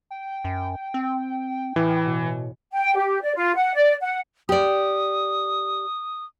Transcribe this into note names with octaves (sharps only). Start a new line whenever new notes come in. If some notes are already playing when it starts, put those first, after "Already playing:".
G5
F#2
C4
A2 E3
B2
G5
G4
D5
F4
F#5
D5
F#5
G4 D5 D#6